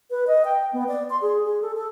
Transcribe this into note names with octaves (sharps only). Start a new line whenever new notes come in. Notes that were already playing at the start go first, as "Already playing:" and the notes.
B4
D#5
G5
B3
D5
C6
G#4
G#4
A4
A4